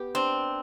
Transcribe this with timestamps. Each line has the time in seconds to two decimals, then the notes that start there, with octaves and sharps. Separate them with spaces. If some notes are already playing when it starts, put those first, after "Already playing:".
Already playing: B3 G4
0.15 C4 D4